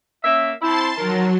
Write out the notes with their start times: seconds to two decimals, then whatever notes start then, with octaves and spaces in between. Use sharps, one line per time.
0.24 A#3 C#4 E5
0.62 C4 E4 A5 C6 A6
0.98 D#3 F#3 A#4